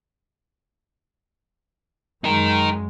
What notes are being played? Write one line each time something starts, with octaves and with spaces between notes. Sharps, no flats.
F#2 G#3 D#4 A#4